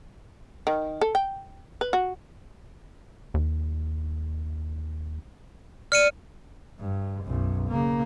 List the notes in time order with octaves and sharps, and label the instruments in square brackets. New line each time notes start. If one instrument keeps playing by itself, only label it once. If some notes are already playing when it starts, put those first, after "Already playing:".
[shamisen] D#3
A4
G5
B4
F#4
[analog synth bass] D#2
[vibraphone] D5 [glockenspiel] F6 C#7 D#7
[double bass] G2
B1 F#2
C#3 A#3